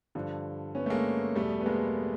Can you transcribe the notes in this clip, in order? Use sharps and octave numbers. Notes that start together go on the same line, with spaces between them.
G2 D3 F3
B3 C#4
A3
G#3 A#3
E2 B2 G3 A3
B3
G#3 A#3